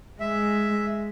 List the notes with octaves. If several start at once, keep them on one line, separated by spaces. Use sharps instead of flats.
G#3 E5